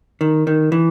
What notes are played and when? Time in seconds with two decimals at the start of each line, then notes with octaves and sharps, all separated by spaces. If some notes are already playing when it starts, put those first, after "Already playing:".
0.21 D#3
0.47 D#3
0.72 E3